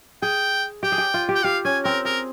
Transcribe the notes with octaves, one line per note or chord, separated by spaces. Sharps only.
G#4 G5
G4 G5
G#4
G4
F4
G4
G5
G4 F5
C#4 G#5
C4 A#4
G#4 A#4